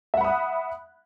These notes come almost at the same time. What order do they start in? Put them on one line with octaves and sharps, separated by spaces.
E5 F#5 B5 D#6 F#6